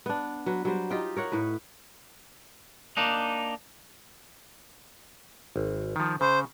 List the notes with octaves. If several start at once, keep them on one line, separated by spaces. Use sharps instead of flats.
B3 D4
F#3 B4
F#3 G3 C5
D#4 F4 G4 G5
A#4 C#5 F#5
A2 B4
A#3 D4 D#4
G#1
D#3 F3
C#3 C5